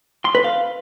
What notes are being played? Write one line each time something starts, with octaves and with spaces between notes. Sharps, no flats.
C6
B4
F5